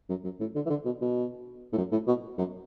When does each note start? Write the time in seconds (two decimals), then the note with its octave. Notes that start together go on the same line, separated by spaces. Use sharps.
0.09 F#2
0.24 F#2
0.40 A2
0.55 D3
0.66 E3
0.70 D3
0.85 B2
1.01 B2
1.73 A2
1.77 F#2
1.92 A2
2.08 B2
2.38 F#2